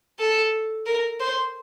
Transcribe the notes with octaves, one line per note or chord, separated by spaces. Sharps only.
A4
A#4
C5